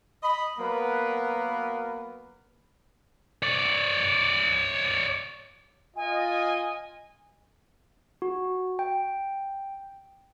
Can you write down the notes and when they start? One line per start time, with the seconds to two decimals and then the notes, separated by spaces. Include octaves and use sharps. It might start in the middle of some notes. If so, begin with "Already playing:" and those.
0.23 D#5 B5
0.58 F#3 A#3 B3 A#4 B4
3.43 C#5 D5
5.96 F4 D#5 G#5
8.22 F#4
8.79 G5